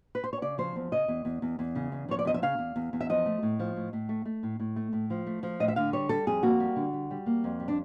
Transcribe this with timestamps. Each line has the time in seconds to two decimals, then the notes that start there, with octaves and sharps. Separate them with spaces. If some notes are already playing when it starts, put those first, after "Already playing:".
0.15 B4
0.24 C5
0.33 C#5
0.42 C#3 D5
0.58 F3 C5
0.76 E2
0.92 C#3 D#5
1.08 E2
1.25 E2
1.42 E2
1.59 E2
1.75 C#3
1.92 E2
2.08 F3 C#5
2.19 D5
2.25 E2 D#5
2.34 E5
2.42 C#3 F5
2.58 E2
2.76 E2
2.93 E2
3.01 E5
3.09 F3 D#5
3.26 A3
3.43 A2
3.60 F3
3.77 A2
3.93 A2
4.09 A3
4.25 A3
4.43 A2
4.60 A2
4.76 A3
4.93 A2
5.10 F3
5.27 A3
5.43 F3
5.60 A2 D#5
5.68 E5
5.76 D3 F5
5.93 G3 C#5
6.09 G3 A4
6.27 F2 G#4
6.43 A#3 F#4
6.60 G3
6.76 D3
6.93 G3
7.11 G3
7.26 A#3
7.44 F2
7.60 G3
7.68 D4